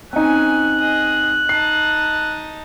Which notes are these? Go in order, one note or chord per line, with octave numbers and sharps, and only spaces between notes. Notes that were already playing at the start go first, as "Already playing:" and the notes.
C4 C#4 D#4 G#5 F#6
G#4 D#5
D#4 A5 C7